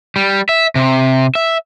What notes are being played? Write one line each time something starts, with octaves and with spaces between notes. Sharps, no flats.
G3
E5
C3
E5